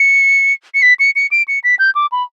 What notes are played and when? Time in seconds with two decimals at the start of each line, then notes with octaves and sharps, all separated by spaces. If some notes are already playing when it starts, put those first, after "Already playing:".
Already playing: C#7
0.74 C#7
0.82 B6
0.99 C#7
1.16 C#7
1.31 D7
1.48 C#7
1.64 B6
1.79 G6
1.95 D6
2.12 B5